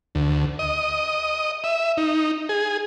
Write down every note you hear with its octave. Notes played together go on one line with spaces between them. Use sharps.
D2
D#5
E5
D#4
G#4